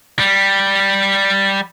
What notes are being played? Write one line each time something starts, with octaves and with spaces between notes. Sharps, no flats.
G3